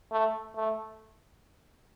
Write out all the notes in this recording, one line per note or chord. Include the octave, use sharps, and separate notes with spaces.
A3
A3